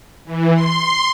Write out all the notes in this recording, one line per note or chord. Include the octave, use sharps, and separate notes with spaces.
E3
C6